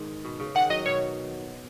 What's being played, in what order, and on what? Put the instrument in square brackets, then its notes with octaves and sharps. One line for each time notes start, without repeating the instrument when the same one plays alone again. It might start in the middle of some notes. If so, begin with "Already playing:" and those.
Already playing: [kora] G#2 D#3
B2
C#3
[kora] D#3 [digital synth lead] F#5
[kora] F#3 [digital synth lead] D#5
[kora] B2 [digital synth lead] C#5